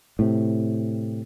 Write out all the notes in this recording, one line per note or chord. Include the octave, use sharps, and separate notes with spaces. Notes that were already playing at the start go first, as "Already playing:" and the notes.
A2 C3